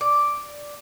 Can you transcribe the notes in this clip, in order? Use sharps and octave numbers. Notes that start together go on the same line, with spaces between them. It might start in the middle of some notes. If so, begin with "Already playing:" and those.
D5